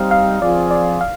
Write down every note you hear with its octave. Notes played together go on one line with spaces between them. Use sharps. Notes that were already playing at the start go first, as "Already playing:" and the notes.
Already playing: G3 C4 D#4 F5
F5
F3 C4 F4 G#4 D5
D5
F5